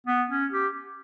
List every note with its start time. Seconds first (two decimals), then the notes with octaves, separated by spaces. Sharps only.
0.07 B3
0.30 C#4
0.52 G4